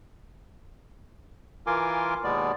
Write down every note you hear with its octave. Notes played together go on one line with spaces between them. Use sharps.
E3 F4 A#4 G#5 C6 D6
D#2 B2 G#3 B3 D5